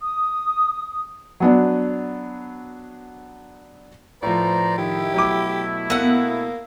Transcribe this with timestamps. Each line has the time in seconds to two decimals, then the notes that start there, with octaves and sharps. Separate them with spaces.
0.02 D#6
1.40 F#3 B3 D4
4.23 A2 F3 B4 C5 D5 A#5
4.78 D#3 D#4 E4 G4
5.14 B2 F#3 A3 E4 D6
5.90 A#3 B3 F#5 E6